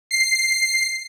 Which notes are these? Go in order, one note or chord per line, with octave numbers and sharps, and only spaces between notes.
C7